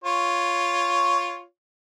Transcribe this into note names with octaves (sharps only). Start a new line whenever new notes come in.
F4 C#5